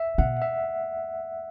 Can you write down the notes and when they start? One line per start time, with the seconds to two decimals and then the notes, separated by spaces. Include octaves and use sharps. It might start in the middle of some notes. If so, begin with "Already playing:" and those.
Already playing: E5
0.18 B2 F#5
0.42 E5